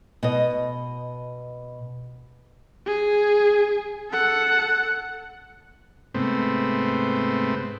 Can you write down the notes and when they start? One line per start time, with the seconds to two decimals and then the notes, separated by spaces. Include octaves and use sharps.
0.23 B2 D#5
2.86 G#4
4.10 A4 F#5
6.14 G#2 C3 A3 B3 C4